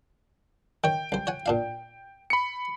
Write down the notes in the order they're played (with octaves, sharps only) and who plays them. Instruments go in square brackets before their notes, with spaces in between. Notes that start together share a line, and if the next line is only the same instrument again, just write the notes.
[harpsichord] D#3 C#5 [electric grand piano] G5
[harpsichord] C2 C5
C#5 F#5 G#5
A#2 D4 F5
[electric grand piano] B5 C#7